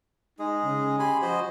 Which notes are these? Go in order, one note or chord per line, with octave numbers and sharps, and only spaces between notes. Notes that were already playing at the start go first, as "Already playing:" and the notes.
G#3 D#4 G#4
C#3
G4 G#5 B5 C6
F3 F#4 C5 D#5